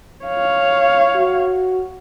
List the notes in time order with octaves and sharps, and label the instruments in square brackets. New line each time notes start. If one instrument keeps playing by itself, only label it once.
[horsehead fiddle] C#5 F5
[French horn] F#4